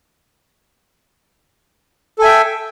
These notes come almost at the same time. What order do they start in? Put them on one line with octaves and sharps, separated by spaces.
A4 G#5 E5 G5